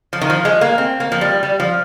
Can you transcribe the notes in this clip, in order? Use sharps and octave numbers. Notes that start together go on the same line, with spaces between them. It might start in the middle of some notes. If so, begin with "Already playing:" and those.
F3
D#3
F3
G#3
A#3
C4
A#3
F3
G3
G3
F3